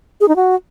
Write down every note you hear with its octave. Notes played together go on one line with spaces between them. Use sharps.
G#4
D#4
F#4